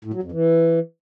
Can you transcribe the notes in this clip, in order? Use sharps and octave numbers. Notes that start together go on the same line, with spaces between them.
A2
F#3
F2
E3